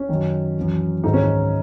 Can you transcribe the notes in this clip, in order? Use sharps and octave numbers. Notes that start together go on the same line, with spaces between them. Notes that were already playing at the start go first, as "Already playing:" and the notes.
Already playing: C#4
F#2 D#3
F#2 E3
G#2 D#3 D#4
C#4
D#4